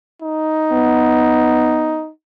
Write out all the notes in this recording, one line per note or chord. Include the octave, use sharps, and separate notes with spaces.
D#4
B3